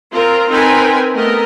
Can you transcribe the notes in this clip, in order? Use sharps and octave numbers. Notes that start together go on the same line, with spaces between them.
C4 F4 A#4
C4 D#4 A#4 B4 G5 G#5
A3 B3 A#4 D#5